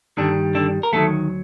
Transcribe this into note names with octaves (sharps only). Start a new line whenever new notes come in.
G2 D3 D#3 G3 D4
D3 D4
A#4
D2 C3 D#3 F#3 A3 A4